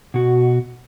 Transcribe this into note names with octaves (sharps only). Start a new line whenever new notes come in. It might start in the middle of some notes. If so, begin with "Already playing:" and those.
B2 F#4